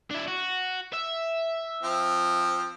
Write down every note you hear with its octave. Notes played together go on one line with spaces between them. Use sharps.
D4 E4
F#4
E5
F3 C4